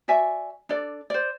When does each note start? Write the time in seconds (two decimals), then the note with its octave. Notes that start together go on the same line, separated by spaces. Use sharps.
0.08 F#4 D5 E5 G#5
0.69 D4 A4 D5
1.10 C5 D5